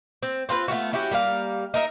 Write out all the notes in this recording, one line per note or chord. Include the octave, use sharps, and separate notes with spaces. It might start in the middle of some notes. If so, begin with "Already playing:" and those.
C4
C4 F4 A#4 B4
A3 B3 F4 F#4
C#4 E4 F#4 G4
G3 A#3 D#4 F5
D#4 A#4 E5